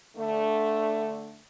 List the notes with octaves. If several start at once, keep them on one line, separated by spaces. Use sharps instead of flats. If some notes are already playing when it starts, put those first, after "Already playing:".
D3 A3